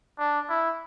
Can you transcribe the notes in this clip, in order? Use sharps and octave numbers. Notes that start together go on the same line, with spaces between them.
D4
E4